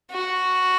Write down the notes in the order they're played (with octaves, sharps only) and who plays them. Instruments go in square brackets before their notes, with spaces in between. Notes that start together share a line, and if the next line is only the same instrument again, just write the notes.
[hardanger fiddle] F#4